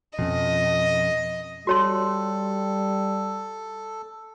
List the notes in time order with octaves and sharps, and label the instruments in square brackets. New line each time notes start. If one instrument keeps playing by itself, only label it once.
[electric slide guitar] F2 [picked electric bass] B2 C#4 [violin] D#5
[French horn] G3 [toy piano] F#4 C#5 C6 [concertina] A4